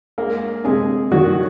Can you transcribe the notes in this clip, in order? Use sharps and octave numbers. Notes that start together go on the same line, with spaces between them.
G#3 A#3 A#4
C3 G#3 G#4
D#3 F#3 F#4